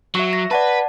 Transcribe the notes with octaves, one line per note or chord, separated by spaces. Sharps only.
F#3 E5 C#6
A#6
B4 D5 F#5 A5